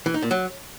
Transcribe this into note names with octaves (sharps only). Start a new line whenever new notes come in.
E3
D#4
A#2
F#3